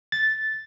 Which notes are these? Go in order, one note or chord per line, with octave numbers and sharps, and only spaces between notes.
A6